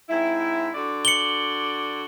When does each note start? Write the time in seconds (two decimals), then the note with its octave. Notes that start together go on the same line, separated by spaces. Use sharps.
0.09 G#2 C4 E4
0.75 D3 F#4 D5
1.05 C#7 F#7 G7